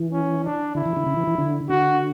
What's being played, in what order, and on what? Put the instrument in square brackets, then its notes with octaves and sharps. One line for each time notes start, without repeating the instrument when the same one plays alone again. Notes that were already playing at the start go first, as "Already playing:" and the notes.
Already playing: [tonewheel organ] E3
[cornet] C#4
D4
[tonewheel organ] D3 [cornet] E4
[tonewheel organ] E3
D3
C#3
E3
E3
D3
[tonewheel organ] D3 [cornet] F#4